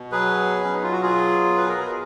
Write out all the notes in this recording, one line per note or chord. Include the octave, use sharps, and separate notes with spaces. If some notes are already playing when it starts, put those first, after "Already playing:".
Already playing: B2
F#3 G#4 B4
F#3
C#4
D#4
F4
F#4
B2 F4 G#4
B2
B4
A#4
G#4